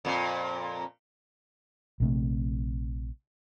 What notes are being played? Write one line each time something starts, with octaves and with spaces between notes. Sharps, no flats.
F2 A#2
A#1 C3 A3